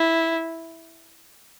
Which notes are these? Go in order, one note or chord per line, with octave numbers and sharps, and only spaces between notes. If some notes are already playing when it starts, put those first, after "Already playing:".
Already playing: E4